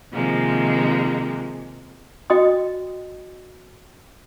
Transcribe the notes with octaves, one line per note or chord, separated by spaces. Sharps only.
C3 D#3 F3 G#3 A#3
F#4 D#5 G5 D#6